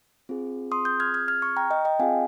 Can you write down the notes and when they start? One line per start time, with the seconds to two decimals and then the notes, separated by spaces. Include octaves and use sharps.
0.29 C4 F4 G#4
0.72 C6 D#6
0.85 D#6 G6
1.00 F6 G#6
1.14 F6 G#6
1.28 F6 G#6
1.42 C#6 F6
1.57 G5 A#5
1.71 D#5 G5
1.85 D#5 G5
1.99 C4 F4 G#4 F5 G#5